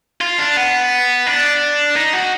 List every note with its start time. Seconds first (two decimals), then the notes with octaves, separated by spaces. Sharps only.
0.21 F4
0.38 D4
0.57 B3
1.26 D4
1.96 D#4
2.14 F#4